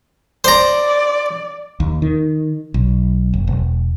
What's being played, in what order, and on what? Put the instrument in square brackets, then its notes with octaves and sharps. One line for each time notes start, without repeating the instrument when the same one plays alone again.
[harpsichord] C5 A#5 [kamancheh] D5
[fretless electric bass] D#2
D#3
B1
F#1
E1